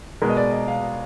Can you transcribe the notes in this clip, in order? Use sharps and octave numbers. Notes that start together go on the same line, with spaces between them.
B2 G#3 B3 A#4
D#5
D5
D#5
F5